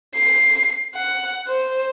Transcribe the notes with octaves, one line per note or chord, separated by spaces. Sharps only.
C7
F#5
C5